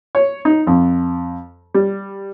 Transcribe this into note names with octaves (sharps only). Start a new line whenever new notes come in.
C#5
D#4
F2
G3